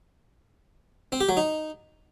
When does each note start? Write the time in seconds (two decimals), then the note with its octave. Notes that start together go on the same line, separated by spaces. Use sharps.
1.12 C4
1.21 G4
1.29 F#3
1.37 D#4